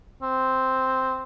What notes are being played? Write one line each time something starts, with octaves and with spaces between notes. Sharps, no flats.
C4